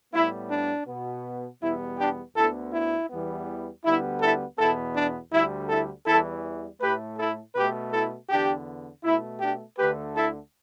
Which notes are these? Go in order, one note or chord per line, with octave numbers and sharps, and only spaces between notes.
A2 G3 B3 E4
D4
B2 B3
E2 B2 G3 B3 E4
D4 G4
D2 D3 B3 E4 A4
E4
E2 E3 G3 B3
D2 D3 G3 B3 E4
E4 A4
E2 B2 B3 E4 A4
D4
D2 D3 G3 E4
E4 A4
E2 E3 G3 E4 A4
A2 A3 G4 B4
E4 A4
B2 A3 G4 B4
E4 A4
E2 D3 B3 D4 G4
B2 A3 E4
D4 G4
D2 D3 A3 G4 B4
E4 A4